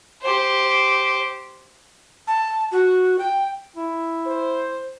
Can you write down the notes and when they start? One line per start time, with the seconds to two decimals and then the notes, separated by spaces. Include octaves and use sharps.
0.22 G4 C5
2.27 A5
2.72 F#4
3.19 G5
3.76 E4
4.26 C5